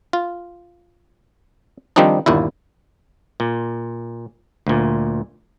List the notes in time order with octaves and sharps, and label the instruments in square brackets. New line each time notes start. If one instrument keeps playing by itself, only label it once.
[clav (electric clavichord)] F4
D#3 F3 G3 C4 D4 D#4
G1 D#2 A#2 E4
A#2
D2 A#2